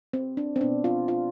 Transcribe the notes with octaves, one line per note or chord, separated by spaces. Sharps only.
C4
D4
C4
B2 B3 D4
F4
F4